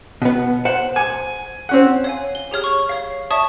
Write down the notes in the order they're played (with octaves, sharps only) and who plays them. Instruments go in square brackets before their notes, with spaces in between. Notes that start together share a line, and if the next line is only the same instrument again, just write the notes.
[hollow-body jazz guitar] B2 B3
C5 F#5
[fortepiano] G#5
C4 C#4 F#5
[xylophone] C#5 F5 G#5
G7
G4 G#4 C#5 F6
C#6
C#5 F5
C#5 D5 E5 A5 C#6 D#6